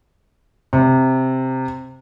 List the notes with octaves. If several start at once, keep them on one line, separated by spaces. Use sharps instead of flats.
C3